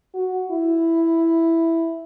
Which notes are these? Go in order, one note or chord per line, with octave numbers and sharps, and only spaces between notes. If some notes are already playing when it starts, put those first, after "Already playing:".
F#4
E4